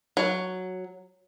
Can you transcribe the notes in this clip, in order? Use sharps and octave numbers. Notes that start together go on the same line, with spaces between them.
F#3